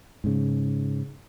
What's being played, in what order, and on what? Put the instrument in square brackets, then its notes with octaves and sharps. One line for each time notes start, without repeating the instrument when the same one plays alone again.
[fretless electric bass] G#2 C#3